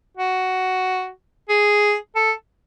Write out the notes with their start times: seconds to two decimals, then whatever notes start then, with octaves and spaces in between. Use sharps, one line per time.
0.17 F#4
1.49 G#4
2.16 A4